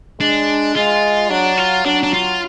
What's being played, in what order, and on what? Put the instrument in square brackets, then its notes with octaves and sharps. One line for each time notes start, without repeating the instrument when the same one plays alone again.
[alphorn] G#3 [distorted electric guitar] D4
[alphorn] G#3 [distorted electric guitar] F4
[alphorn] F#3 [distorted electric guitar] D4
[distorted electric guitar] F4
[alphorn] F#3 [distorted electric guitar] D4
[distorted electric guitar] D4
F4